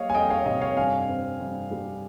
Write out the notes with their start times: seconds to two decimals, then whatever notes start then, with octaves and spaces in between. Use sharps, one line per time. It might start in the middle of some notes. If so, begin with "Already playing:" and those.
Already playing: G3 A#3 C#5 D#5 F5
0.10 G#5
0.15 F2 D#5 G5
0.30 C#5 F5
0.46 C3 D#5
0.61 C#5 F5
0.77 G2 F5 G#5
1.09 C4
1.40 G2
1.71 G3